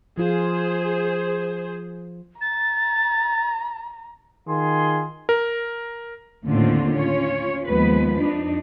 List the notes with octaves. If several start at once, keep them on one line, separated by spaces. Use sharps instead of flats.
F3 F4 G#4 C5
A#5 A6
D#3 F4 G#4 C6
A#4
D#2 A2 D3 C4 C#4 F4
C#4 F4 C#5
D#2 F3 G#3 B3 B4
F2 D4 D#4